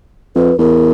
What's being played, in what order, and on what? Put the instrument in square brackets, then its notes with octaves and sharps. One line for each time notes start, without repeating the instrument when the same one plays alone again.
[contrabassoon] F2 [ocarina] B4
[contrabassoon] E2 [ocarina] A#4